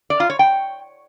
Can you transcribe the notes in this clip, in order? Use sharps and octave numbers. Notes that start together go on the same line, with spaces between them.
D5
F4
C#5
G5